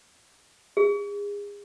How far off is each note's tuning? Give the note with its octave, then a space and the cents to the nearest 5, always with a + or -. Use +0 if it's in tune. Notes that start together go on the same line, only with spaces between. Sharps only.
G#4 -30